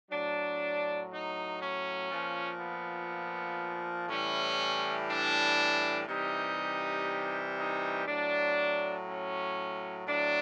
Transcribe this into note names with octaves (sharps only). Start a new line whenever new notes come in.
A2 F#3 D4
D#4
C#4
A#2 F3
B3
A2 E3 G3 C#4
D4
C3 E3 G3 D#4
D#4
A2 F#3 D4
C#4
A2 F#3 D4